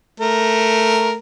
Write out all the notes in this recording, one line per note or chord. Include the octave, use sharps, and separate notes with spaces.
A3 A#4